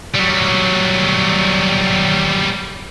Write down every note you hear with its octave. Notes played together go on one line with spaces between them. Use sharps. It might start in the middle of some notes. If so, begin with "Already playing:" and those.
F#3 G3